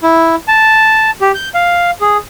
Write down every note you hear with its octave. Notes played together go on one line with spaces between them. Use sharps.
E4
A5
G4
G6
F5
G#4